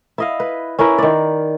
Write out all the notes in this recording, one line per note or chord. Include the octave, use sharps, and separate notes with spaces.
E4 D#5 F5
B4
C#4 E4 A#4 B4
D#3 D5